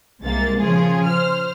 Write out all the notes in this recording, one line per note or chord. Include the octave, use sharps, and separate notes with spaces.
C2 C3 G#3 A#3 A6
A#2 C#3 F3 F4 G#4
C5 F6